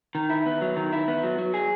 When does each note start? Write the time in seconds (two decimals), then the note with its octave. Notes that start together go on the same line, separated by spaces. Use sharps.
0.15 D#3
0.30 E4
0.46 B3
0.62 F#3
0.76 D#3
0.93 E4
1.08 B3
1.23 F#3
1.38 F#3
1.54 G#4